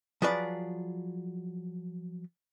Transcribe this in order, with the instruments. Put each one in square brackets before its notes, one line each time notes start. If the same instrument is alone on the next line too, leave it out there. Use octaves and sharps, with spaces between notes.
[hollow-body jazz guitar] F3 F#3 G#4 B4 D5